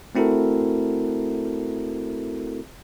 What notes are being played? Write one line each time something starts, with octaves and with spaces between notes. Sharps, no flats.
A3 C4 E4 F#4 A4 A#4